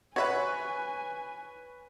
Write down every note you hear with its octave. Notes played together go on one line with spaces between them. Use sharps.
F#4 B4 C#5 E5 G#5 B5 C#6